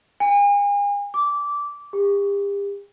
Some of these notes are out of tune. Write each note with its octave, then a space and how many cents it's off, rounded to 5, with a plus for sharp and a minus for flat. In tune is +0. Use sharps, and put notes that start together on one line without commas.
G#5 -40
D6 -15
G4 +40